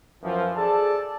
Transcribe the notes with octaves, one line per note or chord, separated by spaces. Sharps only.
F#2 E3 F3
G#4 A4 D5 A5